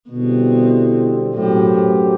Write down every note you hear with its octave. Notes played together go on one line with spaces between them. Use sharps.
B2 D3 G3 C4 E4
F#2 A2 F#3 C4 G4